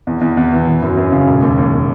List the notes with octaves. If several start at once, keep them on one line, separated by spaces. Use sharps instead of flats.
E2
E2
E2
E3
E3
F#2
F#2
C#3
E1
D#2
D#2